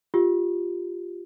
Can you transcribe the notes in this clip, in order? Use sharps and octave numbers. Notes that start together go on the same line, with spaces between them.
F4 G4